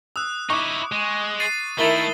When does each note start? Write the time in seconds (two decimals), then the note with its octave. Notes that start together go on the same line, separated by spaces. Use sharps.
0.16 D#6 E6 F#6
0.50 D#4 E4 C#6 D6
0.92 G#3
1.40 A6 C7 D#7
1.79 D#3 A3 E4 A#4 E5 A6 F#7 G7